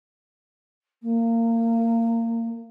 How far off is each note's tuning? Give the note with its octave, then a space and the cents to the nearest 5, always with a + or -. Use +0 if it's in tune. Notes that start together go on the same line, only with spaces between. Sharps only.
A#3 -25